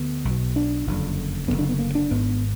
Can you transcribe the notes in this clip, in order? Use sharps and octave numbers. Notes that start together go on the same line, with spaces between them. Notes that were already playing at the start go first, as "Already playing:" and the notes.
Already playing: D2 D3 B3
B1
B2
D4
F#1 F2 D3
F#1 F#2 D3 B3
D4
B3
A#3
D4
G#1 G#2 B3